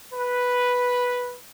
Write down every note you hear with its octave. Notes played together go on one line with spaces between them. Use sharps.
B4